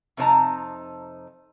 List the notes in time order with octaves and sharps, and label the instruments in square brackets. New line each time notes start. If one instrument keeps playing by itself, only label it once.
[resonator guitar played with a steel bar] F2 C3 D#4 C#5 A5 A#5